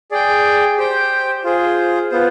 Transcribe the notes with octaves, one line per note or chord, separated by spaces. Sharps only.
G#4 D5 G5
G4 C5 G5
F4 G#4 C5
B3 F4 C5